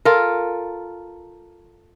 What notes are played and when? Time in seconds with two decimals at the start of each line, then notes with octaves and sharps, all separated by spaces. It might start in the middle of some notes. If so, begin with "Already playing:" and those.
0.05 F4 A4 A#4